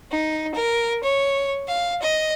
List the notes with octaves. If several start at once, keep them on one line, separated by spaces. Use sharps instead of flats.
D#4
A#4
C#5
F5
D#5